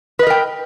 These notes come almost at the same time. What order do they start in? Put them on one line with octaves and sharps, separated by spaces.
B4 D#5 A#4 G5